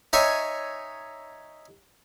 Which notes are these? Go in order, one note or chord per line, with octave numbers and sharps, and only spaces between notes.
D#4 C#5 E5 G#5